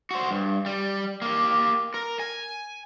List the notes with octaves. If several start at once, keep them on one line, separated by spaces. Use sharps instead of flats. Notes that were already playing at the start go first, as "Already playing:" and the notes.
F#4 C5
G2
G3
A#3 G4
A#4
G#5